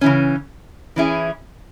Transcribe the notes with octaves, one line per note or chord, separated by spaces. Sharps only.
C#3 E3 C#4
E3 C#4 E4 G#4